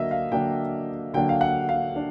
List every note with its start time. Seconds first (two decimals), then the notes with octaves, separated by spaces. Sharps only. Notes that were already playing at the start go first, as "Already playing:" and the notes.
Already playing: D3 F#3 A#3 D4 D#5 E5
0.11 F5
0.32 D3 F#3 A#3 D4 G5
1.14 D3 F#3 A#3 D4 G5
1.29 F5
1.41 F#5
1.69 F5
1.96 D4